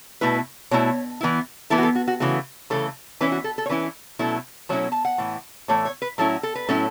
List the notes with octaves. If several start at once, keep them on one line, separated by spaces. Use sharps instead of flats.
B2 A3 E4 B4
B2 A3 E4 C#5
E3 B3 E4
E3 B3 E4 A4
F#4
A4
F#4
F#4
C#3 E3 A3 F#4
C#3 E3 A3 A4
E3 C#4 E4 B4
F#4
A4
A4
C#5
E3 C#4 E4 B4
B2 F#3 A3 C#4 E4 A4
B2 F#3 A3 C#4 E4 C#5
A5
F#5
A2 E3
A2 E3 A3 E4 C#5
C#5
B4
A2 F#3 C#4 E4 A4
A4
B4
A2 F#3 C#4 E4 A4